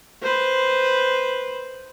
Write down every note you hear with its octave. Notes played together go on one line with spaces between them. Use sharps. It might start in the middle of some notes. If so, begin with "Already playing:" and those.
B4 C5